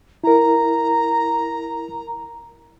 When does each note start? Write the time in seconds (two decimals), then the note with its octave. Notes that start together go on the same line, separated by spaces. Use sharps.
0.24 E4 A#4 A#5